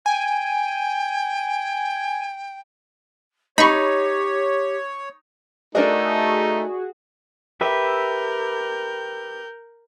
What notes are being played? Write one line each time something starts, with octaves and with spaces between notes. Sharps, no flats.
G5 G#5
D#4 G4 C#5 B5 C#6
A3 D4 D#4 F#4 G#4 A#4 D#5
G4 A#4 B4 E5 G6